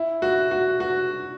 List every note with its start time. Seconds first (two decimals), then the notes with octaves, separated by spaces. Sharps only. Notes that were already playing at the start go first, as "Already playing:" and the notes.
Already playing: E4
0.22 F#4
0.51 F#4
0.80 F#4